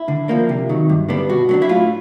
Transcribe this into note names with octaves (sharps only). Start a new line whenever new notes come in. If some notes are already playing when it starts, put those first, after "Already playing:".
Already playing: E4
D3
F3 A#3 D4
C3
D#3 F#3
G2
D3 G3 B3 D4
B2 F#4
F#3 B3 D4
E4
A2 F4